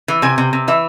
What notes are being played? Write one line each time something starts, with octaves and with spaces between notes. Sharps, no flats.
E3
C3 G#5
C3
C3
E3 E5